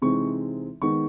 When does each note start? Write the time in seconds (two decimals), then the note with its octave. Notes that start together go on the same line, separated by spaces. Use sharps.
0.02 C3 E3 G#3 C4 D#4 C#6
0.82 D#3 G#3 B3 D#4 C#6